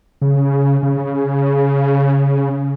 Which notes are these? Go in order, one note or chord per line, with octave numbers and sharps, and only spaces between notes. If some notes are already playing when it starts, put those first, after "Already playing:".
C#3
C#3